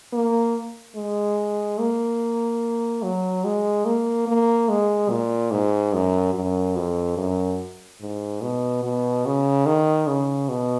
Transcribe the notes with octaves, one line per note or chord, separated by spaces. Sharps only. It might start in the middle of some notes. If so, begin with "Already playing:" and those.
A#3
G#3
A#3
F#3
G#3
A#3
A#3
G#3
A#2
G#2
F#2
F#2
F2
F#2
G#2
B2
B2
C#3
D#3
C#3
B2